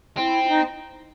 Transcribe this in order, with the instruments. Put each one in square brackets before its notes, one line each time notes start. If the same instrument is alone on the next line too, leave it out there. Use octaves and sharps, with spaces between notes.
[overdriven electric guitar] C4 [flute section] E4
[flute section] E4
D#4